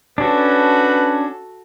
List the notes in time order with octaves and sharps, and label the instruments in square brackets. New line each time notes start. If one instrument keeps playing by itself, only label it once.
[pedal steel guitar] C#4 D4 [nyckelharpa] F#4 A4 [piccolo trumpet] B4